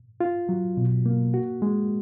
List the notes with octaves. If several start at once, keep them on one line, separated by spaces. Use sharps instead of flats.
F4
F#3
B2
A#3
F#4
G#3